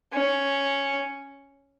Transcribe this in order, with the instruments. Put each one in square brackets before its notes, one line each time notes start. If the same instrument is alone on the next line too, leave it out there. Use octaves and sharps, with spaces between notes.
[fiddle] C#4